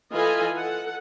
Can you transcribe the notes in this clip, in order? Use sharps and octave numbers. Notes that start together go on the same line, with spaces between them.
E3 F4 A4 D#5 G#5 B5
A4 F#5